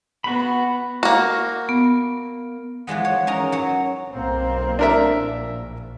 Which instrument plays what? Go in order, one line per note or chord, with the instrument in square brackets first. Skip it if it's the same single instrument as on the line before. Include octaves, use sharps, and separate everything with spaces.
[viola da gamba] B3 [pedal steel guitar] F#4 B5
[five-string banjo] A#3 F#4
[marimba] B3
[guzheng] E3 F3 G#3 B3
C#5
C#4 D#4 A#4 A#5
F#3 C#5
[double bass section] B1 A#3 C4
[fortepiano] D4 A#4 E5
[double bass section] A#1